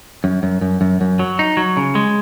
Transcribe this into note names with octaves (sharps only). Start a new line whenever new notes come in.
F#2
F#2
F#2
F#2
F#2
F#3
D#4
F#3
C#3
G#3